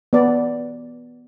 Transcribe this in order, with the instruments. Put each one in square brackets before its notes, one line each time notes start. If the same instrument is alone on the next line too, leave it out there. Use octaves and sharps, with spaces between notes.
[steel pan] B3 D5